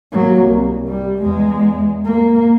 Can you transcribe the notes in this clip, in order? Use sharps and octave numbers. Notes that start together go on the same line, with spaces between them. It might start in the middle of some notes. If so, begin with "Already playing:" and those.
F#3 A#3
C2
G3
E2 G#3
A#3